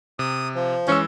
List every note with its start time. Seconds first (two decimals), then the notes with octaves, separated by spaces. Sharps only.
0.19 C3 D#6
0.55 F3
0.88 E3 G#3 C#4 E6